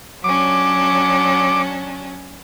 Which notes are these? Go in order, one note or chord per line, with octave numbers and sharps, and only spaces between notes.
F#3 C#4 D4 D6